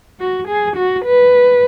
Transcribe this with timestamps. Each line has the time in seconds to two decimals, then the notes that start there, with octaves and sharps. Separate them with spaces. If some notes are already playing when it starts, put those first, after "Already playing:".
0.20 F#4
0.48 G#4
0.77 F#4
1.05 B4